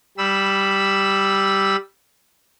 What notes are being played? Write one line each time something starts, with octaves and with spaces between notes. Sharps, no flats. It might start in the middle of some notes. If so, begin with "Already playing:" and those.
G3 B5 E6